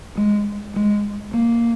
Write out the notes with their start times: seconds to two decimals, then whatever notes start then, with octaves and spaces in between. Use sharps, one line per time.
0.17 G#3
0.76 G#3
1.34 A#3